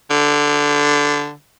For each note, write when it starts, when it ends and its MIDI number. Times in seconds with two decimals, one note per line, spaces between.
0.10 1.33 50